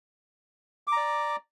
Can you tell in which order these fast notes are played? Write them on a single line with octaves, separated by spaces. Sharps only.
D6 A#5 D5